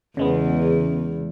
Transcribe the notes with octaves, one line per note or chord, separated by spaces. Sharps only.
E2 C#3 G#3 B3